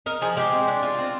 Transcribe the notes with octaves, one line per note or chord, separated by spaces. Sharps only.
D#4 A#4
F3 G#4
G#3 G4
C4
D4
F4
C4